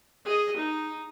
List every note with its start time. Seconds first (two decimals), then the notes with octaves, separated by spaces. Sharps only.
0.25 G#4 D#5
0.57 D#4